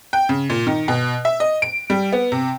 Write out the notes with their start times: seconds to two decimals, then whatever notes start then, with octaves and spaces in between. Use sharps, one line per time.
0.13 G5
0.29 C#3
0.50 A#2
0.67 D#3
0.88 B2
1.25 E5
1.40 D#5
1.62 D7
1.90 G3
2.12 B3
2.32 C3